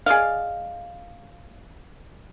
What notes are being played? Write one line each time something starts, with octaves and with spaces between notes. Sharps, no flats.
G#4 D5 D#5 F5